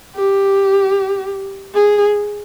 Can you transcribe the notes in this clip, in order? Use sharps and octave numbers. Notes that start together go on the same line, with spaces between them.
G4
G#4